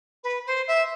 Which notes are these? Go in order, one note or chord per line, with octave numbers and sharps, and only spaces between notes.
B4
C5
E5